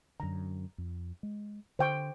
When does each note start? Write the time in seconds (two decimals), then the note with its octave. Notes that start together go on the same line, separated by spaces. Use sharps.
0.20 F#2 D3 A#5
0.78 F2
1.23 G#3
1.79 D3 C5 G5 C#6